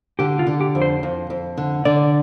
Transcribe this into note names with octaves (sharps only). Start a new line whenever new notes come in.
D3 G4
F4
D3
G4
F2
C5
F2
F2
D3
D3 D5